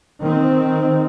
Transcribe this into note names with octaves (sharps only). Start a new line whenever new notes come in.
D#3 C4